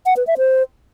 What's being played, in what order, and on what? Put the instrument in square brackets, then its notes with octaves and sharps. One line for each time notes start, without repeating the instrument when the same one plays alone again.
[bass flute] F#5
B4
E5
C5